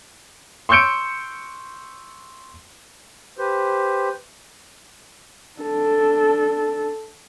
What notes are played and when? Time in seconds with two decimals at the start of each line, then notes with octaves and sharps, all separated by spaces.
0.69 C6 C#6 E6 G6 C#7 D7
3.38 G4 B4 C5
5.60 D4 A4